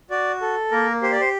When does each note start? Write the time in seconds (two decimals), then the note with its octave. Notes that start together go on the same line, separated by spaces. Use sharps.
0.10 F#4 D5
0.41 A4
0.71 A#3 A#4
1.02 G4 C5
1.12 D5
1.21 C5